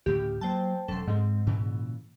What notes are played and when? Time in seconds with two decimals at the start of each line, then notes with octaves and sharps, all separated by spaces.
0.06 D2 A2 C#3 G4
0.41 F#3 A#3 C5 G5 A5
0.88 E1 F#2 A4 C6
1.07 G#2 G#3 C4
1.47 A#2 C#3 E3